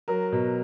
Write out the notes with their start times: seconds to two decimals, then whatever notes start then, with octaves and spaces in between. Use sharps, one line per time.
0.08 F#3 A#4
0.32 B2